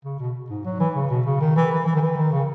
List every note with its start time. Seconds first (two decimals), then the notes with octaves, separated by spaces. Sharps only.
0.05 C#3
0.19 B2
0.50 G#2
0.65 F#3
0.80 E3
0.95 C#3
1.10 B2
1.26 C#3
1.41 D#3
1.56 E3
1.71 E3
1.86 E3
1.95 D#3
2.01 E3
2.17 D#3
2.32 C#3